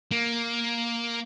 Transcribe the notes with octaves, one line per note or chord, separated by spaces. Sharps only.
A#3